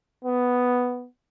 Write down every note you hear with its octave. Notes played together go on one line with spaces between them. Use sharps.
B3